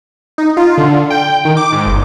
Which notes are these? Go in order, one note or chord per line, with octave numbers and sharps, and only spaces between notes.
D#4
F4
D3
G5
D#3
D6
G#2
G1